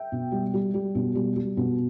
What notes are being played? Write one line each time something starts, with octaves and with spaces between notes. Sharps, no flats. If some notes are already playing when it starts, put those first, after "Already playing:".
Already playing: E5 G5
B2
G3
G3
G3
B2
G3
G3
B2